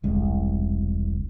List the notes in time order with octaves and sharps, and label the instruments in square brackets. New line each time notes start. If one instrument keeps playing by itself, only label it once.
[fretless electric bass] E1 C2 D3 G#3